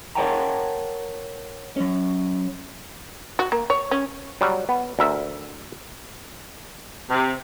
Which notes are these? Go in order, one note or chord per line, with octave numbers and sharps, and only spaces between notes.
A#4 C#5 F#5 G5 A5 A#5
F#3 C#4
F#4
A#3
C#5
C#4
F#3 G3
B3
D2 A#4 E5
C3